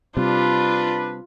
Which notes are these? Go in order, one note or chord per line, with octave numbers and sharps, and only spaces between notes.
C3 G3 D4 F4 B4